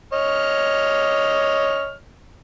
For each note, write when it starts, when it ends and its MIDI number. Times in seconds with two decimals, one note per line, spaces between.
0.13 1.94 73
0.13 1.94 75
0.13 1.94 89